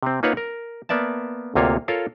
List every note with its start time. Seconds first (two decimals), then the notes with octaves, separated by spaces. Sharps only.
0.03 C3 C4
0.23 A#3 D#4 F4 B4 C#5 F#5
0.37 A#4
0.89 A#3 B3 D5 E5 A5
1.55 D2 C3 A#3 F4 C#5
1.88 F4 A4 A#4 C#5 F5